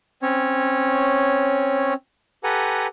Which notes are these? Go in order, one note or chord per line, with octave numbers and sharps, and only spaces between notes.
C4 C#4 C#5
G4 A4 B4 F#5 G#5 A#5